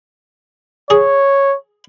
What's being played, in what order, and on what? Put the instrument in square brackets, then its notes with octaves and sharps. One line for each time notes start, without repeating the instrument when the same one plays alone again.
[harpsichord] G#4 [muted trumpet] C#5